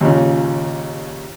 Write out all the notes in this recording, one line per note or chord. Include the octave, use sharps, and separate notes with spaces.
D#2 A#2 C#3